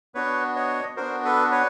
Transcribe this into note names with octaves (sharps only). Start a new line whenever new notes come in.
B3 D4 F#4 B4 C#5
C#5 D#5
B3 D4 F#4 A#4 C5
A4 B4
B4 C#5